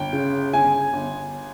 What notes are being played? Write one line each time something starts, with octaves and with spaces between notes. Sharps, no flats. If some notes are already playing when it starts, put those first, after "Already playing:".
Already playing: G1 G5
C#3
G1 G#5
G1